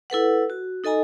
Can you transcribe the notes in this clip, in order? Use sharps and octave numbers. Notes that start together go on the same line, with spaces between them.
E4 A4 B4 F#5
F#4
D#4 A4 D#5 G#5 A#5